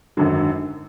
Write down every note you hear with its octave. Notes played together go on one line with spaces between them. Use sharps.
G#1 F#2 D3 F#3